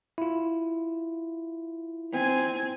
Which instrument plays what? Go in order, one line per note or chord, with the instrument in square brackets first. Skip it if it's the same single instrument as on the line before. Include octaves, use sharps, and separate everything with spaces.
[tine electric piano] E4 F4
[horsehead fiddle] C4 G#5